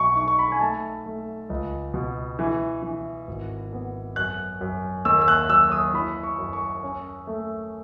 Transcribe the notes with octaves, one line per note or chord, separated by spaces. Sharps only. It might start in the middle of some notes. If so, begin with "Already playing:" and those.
Already playing: B1 C#6
D#4 C#6
C#6
B5
G#5
A3 A5
A3
C#2
B2
E3
E3
G#1
B3
F#2 F#6
F#2
D#2 E6
E6
F#6
F#3 E6
D#6
E3 B5
C#6
F#2
C#6
C#4
A3